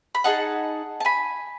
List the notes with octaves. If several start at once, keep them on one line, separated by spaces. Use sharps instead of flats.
B5
D#4 G#4 F#5 A5
A5
G#5 B5